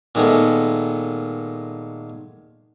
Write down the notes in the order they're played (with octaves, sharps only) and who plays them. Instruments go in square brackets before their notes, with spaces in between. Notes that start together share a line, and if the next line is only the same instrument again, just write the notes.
[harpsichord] A#2 D#3 G#3 A3 B3